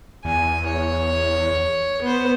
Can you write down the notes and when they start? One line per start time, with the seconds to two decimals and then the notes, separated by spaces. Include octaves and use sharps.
0.25 E2 G#5
0.66 C#5
2.02 B3 C5